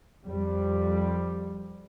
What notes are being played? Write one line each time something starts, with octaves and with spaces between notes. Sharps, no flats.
F2 G3